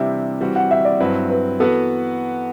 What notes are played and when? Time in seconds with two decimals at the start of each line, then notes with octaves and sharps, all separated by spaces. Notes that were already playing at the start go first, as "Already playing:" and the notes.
Already playing: C3 E3 G3 D4 G4 E5
0.41 E3 G3 C4 F#4
0.56 F#5
0.71 E5
0.85 D5
1.00 G2 F#3 C4 E4 B4
1.30 B4
1.60 E3 B3 F#4 A4 B4